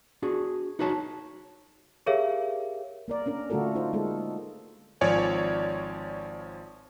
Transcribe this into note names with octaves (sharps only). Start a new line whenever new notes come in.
D4 F#4 G#4
D#4 F#4 B4 C#5 A5
G4 G#4 A#4 C#5 E5 F5
A#3 A#4 D5
C#4 D4 A#4
D3 A3 F4 F#4 A4 A#4
D#4 F4 C5
G#3 A#3 A4
G#1 F3 C#5 D5 G#5